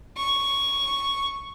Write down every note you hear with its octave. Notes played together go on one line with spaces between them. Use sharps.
C#6